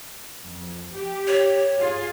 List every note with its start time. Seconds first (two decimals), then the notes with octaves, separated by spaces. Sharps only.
0.44 F2
0.95 G4
1.27 C#5
1.78 F4 G#4